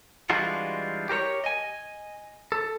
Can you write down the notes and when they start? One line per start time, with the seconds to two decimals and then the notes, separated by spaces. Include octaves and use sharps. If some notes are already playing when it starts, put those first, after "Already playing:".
0.30 E3 G3 G#3 D4 F4 F#4
1.09 G4 A#4 C5 C#5
1.44 D#5 G#5
2.52 A4